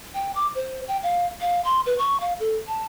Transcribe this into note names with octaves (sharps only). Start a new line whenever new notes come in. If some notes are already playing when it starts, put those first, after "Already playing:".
G5
D6
C5
G5
F5
F5
C6
B4
C#6
F5
A4
A5